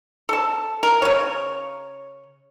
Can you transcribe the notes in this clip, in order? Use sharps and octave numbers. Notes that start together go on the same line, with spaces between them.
A4 A5
A#4
C#3 C#5